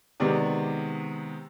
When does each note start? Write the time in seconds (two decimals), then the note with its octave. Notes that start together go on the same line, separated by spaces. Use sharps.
0.20 C3 D#3 G#3 B3 D5